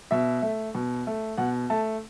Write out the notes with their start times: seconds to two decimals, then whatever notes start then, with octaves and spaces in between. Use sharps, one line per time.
0.11 B2 E5
0.42 A3
0.75 B2
1.07 A3
1.38 B2 F#5
1.70 A3 A5